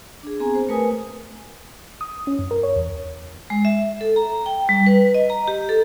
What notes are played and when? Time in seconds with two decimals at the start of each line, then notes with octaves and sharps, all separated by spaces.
0.23 D4 G#4
0.40 B3 C4 G#4 G#5 A#5
0.55 C5
0.69 A3 A#4 B4 G#5 D#6
2.01 D#6
2.27 C#4
2.39 F#2
2.51 A#4
2.63 C#5
2.76 E2
3.50 G#3
3.65 E5
4.01 A4
4.16 A#5
4.46 G5
4.69 G3
4.86 B4
5.14 D#5
5.30 A#5
5.48 G4
5.69 A4